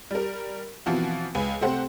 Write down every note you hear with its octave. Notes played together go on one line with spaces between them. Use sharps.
G3 A#4
B2 E3 F3 C4 F#4
C#2 B4 G#5
C3 A3 C4 G4 C5 F#5